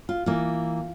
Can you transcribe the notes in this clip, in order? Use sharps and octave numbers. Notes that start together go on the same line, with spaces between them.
F4
E3 A#3 F4